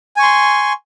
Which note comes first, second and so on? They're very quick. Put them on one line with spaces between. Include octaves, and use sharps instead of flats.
G#5 C#6 C6